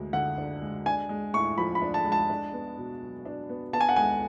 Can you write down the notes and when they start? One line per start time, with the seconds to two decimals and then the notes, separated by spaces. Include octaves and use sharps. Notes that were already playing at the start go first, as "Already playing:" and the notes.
Already playing: D2 G#3
0.13 D3 F#5
0.38 D4
0.62 G#3
0.86 D4 G#5
1.09 G#3
1.34 A2 C#6
1.58 F3 B5
1.75 B5
1.82 D4
1.94 A5
2.06 G#3
2.12 A5
2.29 D4
2.53 B3
2.77 B2
3.01 F#3
3.25 D4
3.49 B3
3.73 B3 A5
3.81 G#5
3.89 F#5
3.96 G#3 G#5